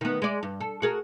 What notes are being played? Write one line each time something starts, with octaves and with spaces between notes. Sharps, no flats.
D#3 B3
G#3 D5
G2
A4
F#4 G#4 A#4